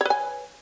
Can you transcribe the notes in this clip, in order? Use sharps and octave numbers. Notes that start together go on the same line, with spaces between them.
B4 C#5 G#5